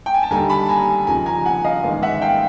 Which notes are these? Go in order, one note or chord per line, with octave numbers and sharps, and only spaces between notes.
G5
G#5
A5
D#2 D3 G3 G#5 A#5
A5 B5
G#5 A#5
D#2 C#3 F3 A#3 G#5 A#5
G#5 A#5
F#5 G#5
D#5 F5
A1 G#2 D#3 G#3 B3
E5 F#5
F5 G5